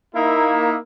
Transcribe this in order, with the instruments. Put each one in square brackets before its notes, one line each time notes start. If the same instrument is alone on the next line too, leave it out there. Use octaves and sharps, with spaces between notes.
[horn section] A#3 D#4 E4